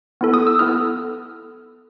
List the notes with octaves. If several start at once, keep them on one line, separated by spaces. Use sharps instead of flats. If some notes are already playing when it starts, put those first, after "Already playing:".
B3 E4 A4
D#6
E6
B3 E4 A4 F6